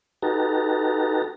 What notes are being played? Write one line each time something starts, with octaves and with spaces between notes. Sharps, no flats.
D#4 F#4 G4 A4 B4 A#5